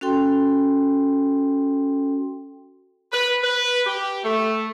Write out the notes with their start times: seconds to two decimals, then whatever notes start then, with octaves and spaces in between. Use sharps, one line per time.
0.01 C#4 F#4 A4 G5 C6
3.12 B4
3.44 B4
3.86 G4
4.24 A3